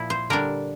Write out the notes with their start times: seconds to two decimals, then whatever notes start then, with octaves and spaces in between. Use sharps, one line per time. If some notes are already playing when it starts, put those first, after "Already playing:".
Already playing: A#2 F3 E4
0.10 C5
0.30 D3 G3 D4 A#4